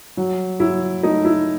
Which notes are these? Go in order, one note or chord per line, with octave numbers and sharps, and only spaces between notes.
F#3
F#3 E4
A3 D#4
E4